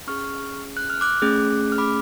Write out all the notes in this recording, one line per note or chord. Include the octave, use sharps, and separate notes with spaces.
C#4 G#4 C#6 F6
F#6
F6
D6 F#6
A3 C#4 G#4
F6
B5 D6